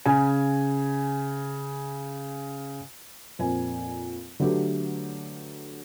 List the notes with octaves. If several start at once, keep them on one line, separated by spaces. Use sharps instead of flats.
C#3 G#5
F2 A#2 C4 A#4 G#5
D3 F#3 A3 F#4 G4 B4